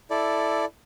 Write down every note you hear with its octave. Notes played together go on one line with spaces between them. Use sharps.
E4 A4 D5